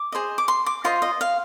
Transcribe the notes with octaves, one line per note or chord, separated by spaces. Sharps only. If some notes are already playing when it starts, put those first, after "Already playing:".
Already playing: D6
G#4 C5 D#5
D6
C6
D6
F4 C5 D#5 C6
D#5
F5